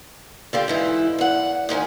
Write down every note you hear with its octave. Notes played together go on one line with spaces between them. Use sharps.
D3 F4 G4
G#2 E3 E4
E2 F#5
D2 G#2 D#3 G#5